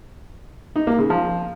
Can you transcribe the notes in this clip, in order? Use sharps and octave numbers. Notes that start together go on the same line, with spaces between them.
D#4
A#3
C#3
F3